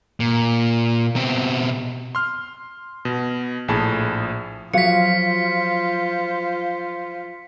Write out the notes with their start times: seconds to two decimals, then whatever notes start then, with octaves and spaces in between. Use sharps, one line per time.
0.20 A#2
1.16 B2 C4
2.15 C6 F6
3.05 B2
3.68 A#1 A2 G#4 A5 B5
4.74 F3 F#3 F4 C5 F5 B6 C#7